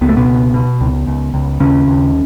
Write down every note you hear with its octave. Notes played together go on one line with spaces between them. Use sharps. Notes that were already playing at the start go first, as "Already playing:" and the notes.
C#2 B3
A3
B2 B3
C#2
B2
C#2
C#2
C#2
D#2 C#3 C#4
D#2